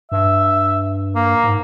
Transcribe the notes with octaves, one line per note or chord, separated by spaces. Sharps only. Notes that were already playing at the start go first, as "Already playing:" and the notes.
G2 E5
A#3
G#2